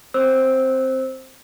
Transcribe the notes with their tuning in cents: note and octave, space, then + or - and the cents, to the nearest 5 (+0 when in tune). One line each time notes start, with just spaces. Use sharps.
C4 +0 C5 +10 E6 -20